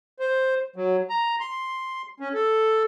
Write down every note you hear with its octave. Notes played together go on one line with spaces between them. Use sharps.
C5
F#3
A#5
C6
C#4
A4